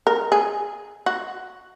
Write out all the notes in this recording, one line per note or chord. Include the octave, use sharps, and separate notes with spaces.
A#4
G#4
F#4